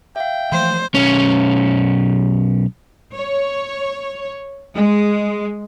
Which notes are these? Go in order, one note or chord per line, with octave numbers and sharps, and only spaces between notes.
E5 F5 G5
E3 F3 A3 C5
B1 C#4
C#5
G#3